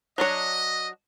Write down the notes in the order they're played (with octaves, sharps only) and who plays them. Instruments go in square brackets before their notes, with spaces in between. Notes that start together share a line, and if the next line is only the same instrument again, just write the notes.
[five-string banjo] F#3 D4 C#5 [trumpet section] D#5